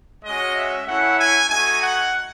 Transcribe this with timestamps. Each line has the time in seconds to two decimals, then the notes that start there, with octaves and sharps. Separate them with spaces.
0.25 G#3 C#4 F#4 D#5
0.56 E5
0.87 A3 C#4 E4 F#5
1.19 G#5
1.50 A3 D#4 F#4 G#5
1.82 F#5